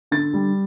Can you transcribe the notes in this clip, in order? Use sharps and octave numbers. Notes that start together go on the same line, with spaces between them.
D3 A6
G3